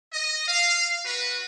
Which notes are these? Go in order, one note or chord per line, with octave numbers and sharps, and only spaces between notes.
D#5
F5
F#4 B4